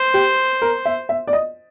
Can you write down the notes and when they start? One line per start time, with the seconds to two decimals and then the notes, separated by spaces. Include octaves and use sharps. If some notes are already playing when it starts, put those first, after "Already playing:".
Already playing: C5
0.14 G4
0.62 A#4
0.85 E5
1.09 E5
1.28 D5
1.33 D#5